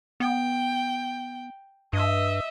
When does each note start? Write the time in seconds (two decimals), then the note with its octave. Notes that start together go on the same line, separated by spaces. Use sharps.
0.20 B3 G5
1.93 G2 D#5 E5